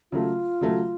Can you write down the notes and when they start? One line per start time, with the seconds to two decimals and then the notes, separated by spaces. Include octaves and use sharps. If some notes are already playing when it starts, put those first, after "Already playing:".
0.12 C#3 F#3 A3 F4
0.61 C#3 F#3 A3